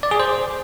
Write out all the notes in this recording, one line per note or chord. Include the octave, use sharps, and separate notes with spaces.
D5
G#4
C5